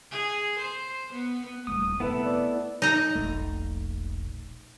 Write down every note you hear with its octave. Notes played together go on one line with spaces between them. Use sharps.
G#4
C5
B3
D#1 A3 D#6
F1 B3 C4 E4 A4 B4
D5
D#4 A#5
E1 A#1 A3